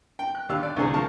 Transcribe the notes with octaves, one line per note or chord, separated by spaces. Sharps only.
G5
F#6
D#2 D4 G4 F5 E6 F#6
D5
C2 D3 A3 G#4 C5
F3 A#4 F5 A5 C#6